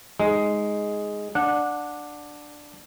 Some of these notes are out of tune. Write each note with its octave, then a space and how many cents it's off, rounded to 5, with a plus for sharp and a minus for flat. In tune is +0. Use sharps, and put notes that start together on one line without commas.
G#3 +0 D#4 +5
D4 +5 F#5 -20